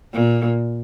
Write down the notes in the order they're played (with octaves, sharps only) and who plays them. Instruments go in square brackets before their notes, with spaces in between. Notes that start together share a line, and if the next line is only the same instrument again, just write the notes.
[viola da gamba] A#2